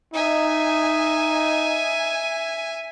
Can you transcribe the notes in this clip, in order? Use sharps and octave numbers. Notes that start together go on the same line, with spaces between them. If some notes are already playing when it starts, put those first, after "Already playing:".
D#4 E5 G#5